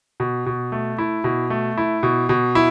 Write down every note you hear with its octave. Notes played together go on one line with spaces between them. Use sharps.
B2
B2
A3
E4
B2
A3
E4
B2
B2
E4